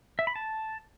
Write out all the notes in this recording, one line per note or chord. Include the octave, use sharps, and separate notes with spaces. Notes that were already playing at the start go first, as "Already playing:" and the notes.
E5
B5
A5